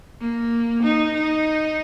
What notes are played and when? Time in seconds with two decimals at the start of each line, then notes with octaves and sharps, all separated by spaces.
0.20 A#3
0.83 D#4
1.15 D#4